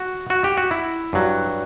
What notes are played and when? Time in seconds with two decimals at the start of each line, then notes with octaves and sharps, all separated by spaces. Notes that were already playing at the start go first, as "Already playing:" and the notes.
Already playing: F#4
0.30 F#4
0.44 G4
0.57 F#4
0.71 E4
1.13 G2 F#3